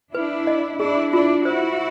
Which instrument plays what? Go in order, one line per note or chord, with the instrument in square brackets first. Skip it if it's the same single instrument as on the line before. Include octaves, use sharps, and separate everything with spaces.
[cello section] D4 E4 [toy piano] B4
[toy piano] D#5
[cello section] D4 E4 [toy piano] G#4
[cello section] D4 E4 [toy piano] F4
[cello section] E4 F#4 [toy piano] C5